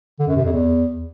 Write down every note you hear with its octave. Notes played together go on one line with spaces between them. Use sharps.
D3
F#2
C3
F2
E2